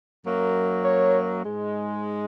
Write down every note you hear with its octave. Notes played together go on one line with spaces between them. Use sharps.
F#2 F#3 A#3
C#5
G#2 G#3